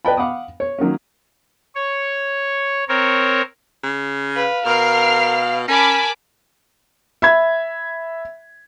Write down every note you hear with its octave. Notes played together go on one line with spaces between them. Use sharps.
B4 D5 D#5 G5 A5 B5
F5 F#5 B5 D6 D#6
C#5
D#3 F#3 A#3 C#4
C#5
C4 A#4 C#5
C#3
B4 F5
B2 A#4 F6 C7
C#4 A#4 G#5 A5 B5 D6
E5 B5 G#6